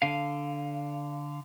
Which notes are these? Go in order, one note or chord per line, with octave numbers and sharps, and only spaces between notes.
D3 F5